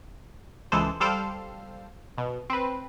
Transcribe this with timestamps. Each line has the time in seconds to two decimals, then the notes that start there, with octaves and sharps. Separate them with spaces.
0.72 C#2 E3 G#3 A4 C5
1.00 G3 A4 C5 F5 G5
2.18 B2
2.50 C4 B4